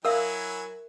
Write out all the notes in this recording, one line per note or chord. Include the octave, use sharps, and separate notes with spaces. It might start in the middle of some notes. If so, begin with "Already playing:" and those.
F#3 E4 A#4 E5 F5 G#5 D#6 E6